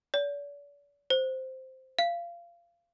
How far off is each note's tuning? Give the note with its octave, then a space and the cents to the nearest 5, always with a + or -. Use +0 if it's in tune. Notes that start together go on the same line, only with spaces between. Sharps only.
D5 -40
C5 -5
F5 -25